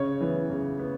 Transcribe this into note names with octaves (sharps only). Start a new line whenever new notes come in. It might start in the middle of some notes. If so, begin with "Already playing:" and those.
Already playing: C#3 C#5
E3 B3
C#3
B3